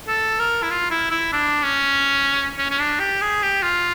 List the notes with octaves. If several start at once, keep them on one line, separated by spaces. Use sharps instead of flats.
A4
A#4
E4
F4
E4
E4
D4
C#4
C#4
C#4
D4
G4
G#4
G4
F4